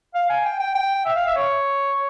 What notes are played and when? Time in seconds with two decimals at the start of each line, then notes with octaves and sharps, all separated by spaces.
0.14 F5
0.29 G#5
0.45 G5
0.59 G5
0.75 G5
1.05 E5
1.15 F5
1.26 E5
1.36 C#5